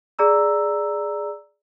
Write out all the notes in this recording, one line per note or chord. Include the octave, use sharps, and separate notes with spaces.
G#4 D5 A#5 E6